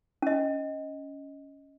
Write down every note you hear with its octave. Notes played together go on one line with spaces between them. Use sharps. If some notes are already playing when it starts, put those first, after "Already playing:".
C#4 D#5